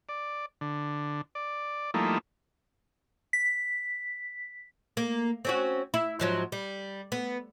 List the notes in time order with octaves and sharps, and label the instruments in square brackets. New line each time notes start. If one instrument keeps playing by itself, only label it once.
[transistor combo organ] D5
D3
D5
F3 G3 A3 A#3 D#4 E4
[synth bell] B6
[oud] A#3
C4 C#4 F#4
E4
G#2 F3 F#3
G3
B3